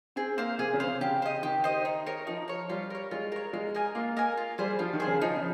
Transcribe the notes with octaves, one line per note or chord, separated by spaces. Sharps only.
C4 G#4
A#3 C5 F5
C3 G#4
C#3
C5 F5
C3
C#3 G4
C5 D#5
D#3 G4
C5 D#5
D#4
A#4 C#5
F3 D#4
A#4 C#5
G3 F4
A#4 C#5
G#3 F4
A#4 C#5
G#3 F4
A#4 D#5 G#5
A#3 F4
A#4 D#5 G#5
F4
G3 G#4 C5
F3 F4
D#3
G#4 C5
C#3
F3 D#4
C#3